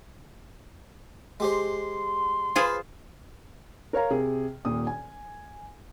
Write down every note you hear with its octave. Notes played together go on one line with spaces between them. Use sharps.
G#3 G4 C5 C6
F4 G#4 B4 C5 F5
A#4 C#5 F5 A#5
C3 G#4
D#1 A#2 D#6
G#5